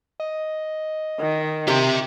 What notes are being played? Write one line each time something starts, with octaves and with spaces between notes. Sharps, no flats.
D#5
D#3
C3 G4 E5